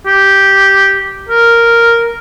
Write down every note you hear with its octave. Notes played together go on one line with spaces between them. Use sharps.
G4
A#4